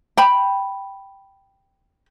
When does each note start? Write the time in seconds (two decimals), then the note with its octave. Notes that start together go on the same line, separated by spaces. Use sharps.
0.17 G5 B5